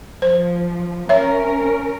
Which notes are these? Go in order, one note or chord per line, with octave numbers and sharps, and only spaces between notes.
F3 C5
C#4 A#4 C#5 E5